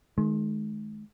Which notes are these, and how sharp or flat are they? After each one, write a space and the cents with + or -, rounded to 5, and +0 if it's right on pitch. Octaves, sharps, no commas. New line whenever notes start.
D#3 +0 G#3 +35